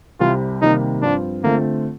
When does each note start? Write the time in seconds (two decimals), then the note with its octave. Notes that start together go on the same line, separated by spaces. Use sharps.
0.20 C2 C3 G3 F4
0.61 C3 D#3 G3 A#3 D#4
1.02 G2 F3 C4 D4 F4
1.43 D3 A3 A#3 C4 F4